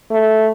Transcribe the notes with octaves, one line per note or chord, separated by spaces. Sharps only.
A3